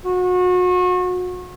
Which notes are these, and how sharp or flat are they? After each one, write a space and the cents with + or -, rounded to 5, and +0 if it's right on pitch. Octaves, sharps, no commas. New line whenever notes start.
F#4 -35